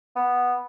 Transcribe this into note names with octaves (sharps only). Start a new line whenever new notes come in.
B3